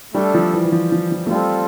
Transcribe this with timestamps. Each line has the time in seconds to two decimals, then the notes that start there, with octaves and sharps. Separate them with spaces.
0.14 G3 A3 D4 A4
0.34 F3
0.53 E3
0.65 E3
0.72 F3
0.92 F3
1.11 F3
1.26 A3
1.31 G3 C4 F4 A4